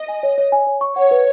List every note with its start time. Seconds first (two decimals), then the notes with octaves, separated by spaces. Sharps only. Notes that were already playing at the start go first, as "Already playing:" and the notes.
Already playing: D#5
0.08 G#5
0.23 C#5
0.38 C#5
0.52 G#5
0.67 C#5
0.81 C#6
0.96 C#5 F#5
1.11 B4